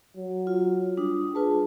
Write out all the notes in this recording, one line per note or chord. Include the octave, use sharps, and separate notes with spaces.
F#3
F4
G3 D4 D#6
F4 G#4 B4 A5